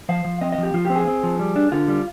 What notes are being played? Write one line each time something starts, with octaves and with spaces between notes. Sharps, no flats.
F3 F5
F3
C4 D#5
D#5
F3
G4
F3 F4
C4 G4
G#4
C4
F3
G3
D4
D3 F4
G3